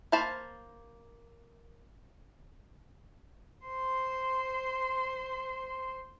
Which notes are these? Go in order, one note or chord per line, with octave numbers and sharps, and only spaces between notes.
A#3 C5 F5 A5 B5
C5 C6